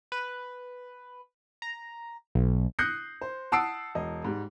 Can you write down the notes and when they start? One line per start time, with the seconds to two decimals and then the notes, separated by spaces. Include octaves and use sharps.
0.12 B4
1.62 A#5
2.35 B1
2.79 D#6 F#6 G6 A#6 C7 C#7
3.21 C5
3.52 F#5 A5 D#6 E6 C7 D7
3.95 E1 D#5
4.24 G#2 G3